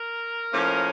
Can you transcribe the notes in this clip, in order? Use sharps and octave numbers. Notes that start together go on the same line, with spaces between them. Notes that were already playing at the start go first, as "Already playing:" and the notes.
Already playing: A#4
A2 F3 A#3 C#4